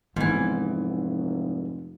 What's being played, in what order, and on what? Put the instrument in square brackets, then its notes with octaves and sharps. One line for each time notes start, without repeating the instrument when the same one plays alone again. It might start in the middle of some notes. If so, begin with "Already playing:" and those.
[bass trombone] F1 [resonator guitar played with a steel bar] G#2 E3 [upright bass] B3